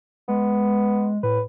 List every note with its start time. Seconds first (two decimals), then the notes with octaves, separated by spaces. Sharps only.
0.29 G#3 B3
1.23 A2 B4